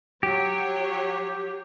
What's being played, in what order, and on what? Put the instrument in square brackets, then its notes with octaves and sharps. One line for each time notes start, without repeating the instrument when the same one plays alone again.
[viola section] F#3 C#5 [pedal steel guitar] G4